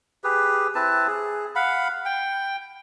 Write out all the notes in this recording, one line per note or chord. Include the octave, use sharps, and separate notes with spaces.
G4 G#4 B4
C4 E4 B4 A5
G#4
F5 F#5 B5
G5